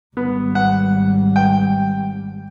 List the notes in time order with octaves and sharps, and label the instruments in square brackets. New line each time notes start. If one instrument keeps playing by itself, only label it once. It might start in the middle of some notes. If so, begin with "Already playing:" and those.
[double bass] G#1 G3 [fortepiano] B3
[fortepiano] F#5
G5